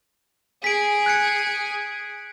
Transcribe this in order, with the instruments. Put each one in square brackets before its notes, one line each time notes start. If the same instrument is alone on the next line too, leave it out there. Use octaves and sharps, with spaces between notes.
[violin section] G#4 [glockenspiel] B6 D7
[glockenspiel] F#6 G#6 C#7